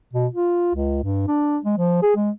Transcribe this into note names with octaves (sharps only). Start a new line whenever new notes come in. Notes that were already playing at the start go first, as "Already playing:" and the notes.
B2
F4
C#2
G2
D4
G#3
F3
G#4
G#3